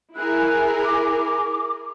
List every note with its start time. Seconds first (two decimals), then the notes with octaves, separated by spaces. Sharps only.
0.16 E4 G#4 A#4 F#6
0.85 D6